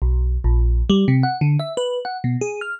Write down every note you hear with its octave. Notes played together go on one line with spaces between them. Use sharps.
B1
A#1
G3
C3
F#5
D3
E5
B4
F#5
B2
G#4
F6